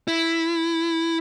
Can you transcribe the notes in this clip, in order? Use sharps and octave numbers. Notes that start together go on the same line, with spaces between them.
E4